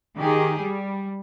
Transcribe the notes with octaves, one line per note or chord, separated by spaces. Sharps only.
D#3 G4 G#4
G3